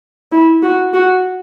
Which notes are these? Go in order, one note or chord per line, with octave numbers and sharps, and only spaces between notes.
E4
F#4
F#4